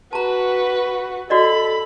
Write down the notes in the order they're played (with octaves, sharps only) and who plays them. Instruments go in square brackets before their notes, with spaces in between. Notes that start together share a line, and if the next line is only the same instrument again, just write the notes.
[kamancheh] F#4 B4 [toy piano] A5 A#5
[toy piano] F#4 D5 D#5 [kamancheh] A4 B5